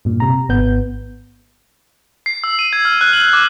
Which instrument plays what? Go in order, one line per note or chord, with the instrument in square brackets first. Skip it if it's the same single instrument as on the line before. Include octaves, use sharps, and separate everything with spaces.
[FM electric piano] G2 A#2
C3 A#5
G#1 B3 G6
[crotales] C7
E6
D#7
G#6
F6
F#6
F#7
D6